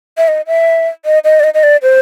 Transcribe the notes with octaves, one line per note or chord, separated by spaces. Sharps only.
E5
D#5
E5
D#5
D#5
D5
D#5
D#5
D5
C5